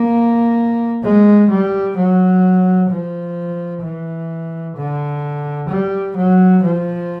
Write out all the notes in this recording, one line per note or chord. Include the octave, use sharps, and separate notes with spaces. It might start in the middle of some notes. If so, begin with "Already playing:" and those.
Already playing: A#3
G#3
G3
F#3
F3
E3
D3
G3
F#3
F3